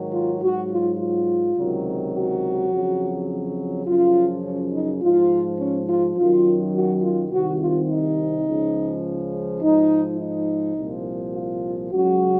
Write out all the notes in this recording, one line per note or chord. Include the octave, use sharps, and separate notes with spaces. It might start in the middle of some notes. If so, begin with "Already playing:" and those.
Already playing: G#2 D#3 F#3
F4
G#2 F#3 F#4
F4
F4
C#2 C3 D#3 F#3
F#4
F2 C#3 F#3
F#2 C#3 F3 F4
C#4
D#4
G#2 F3 F4
C#4
F4
F#2 D#3 F#3 F4
F#4
F4
C2 C3 D#3 F#4
F4
D#4
C#2 C#3 F3
G#2 F3 D#4
D#4
C2 A#2 F3
F4
C#2 C#3 F#3 F#4